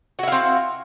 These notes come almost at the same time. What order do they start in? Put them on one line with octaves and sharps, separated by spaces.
F#4 E4 F5 C4